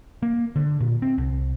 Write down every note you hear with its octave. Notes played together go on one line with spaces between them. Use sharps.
A#3
D3
A#2
C4
C2